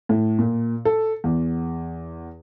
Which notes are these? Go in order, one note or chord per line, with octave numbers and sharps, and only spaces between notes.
A2
A#2
A4
E2